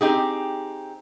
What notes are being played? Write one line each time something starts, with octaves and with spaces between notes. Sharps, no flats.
C4 D#4 G4 G#4